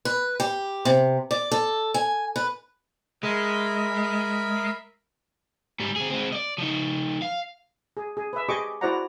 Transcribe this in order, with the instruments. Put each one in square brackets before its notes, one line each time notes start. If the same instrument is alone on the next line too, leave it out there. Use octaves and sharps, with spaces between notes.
[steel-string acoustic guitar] B4
G4
C3
D5
A4
G#5
B4
[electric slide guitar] G#3 [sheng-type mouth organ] A#4 E5 B5
[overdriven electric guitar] G#2 G3
C4 G#4
G#3 C4
D5 D#5
F3 D#4
F5
[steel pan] G#4
G#4
B4 E5
G4 G#4 D#5 C#6 D6
E4 F#4 C5 D5 F#5 A#5